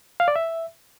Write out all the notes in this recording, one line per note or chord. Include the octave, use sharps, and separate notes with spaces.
F5
D5
E5